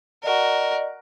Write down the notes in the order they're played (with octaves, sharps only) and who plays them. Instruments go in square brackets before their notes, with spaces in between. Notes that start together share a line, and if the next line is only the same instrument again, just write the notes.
[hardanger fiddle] F#4 A#4 [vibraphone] D5 D#5